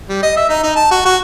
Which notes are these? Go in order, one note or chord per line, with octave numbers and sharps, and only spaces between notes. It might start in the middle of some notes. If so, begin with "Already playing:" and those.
G3
D#5
E5
D#4
D#4
A5
F#4
F#4